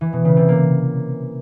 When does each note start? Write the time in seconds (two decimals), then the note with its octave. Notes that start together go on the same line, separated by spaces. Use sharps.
0.01 E3
0.13 B2
0.25 C#3
0.37 C3
0.48 A#3